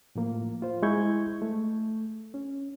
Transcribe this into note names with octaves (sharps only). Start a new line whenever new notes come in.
A2 F3 A#3
F4 C5
G#3 E4 C#6 G6 G#6
A3
C#4